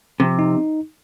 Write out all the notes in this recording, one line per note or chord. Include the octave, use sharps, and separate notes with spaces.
C3 F3
D#4